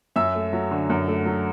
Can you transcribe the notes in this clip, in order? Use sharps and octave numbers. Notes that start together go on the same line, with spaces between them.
F#2 E5 E6
A3
F#3
D3
F#2
A3
F#3